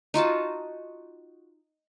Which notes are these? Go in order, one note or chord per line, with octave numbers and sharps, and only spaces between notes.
D#4 F4 F#4 A5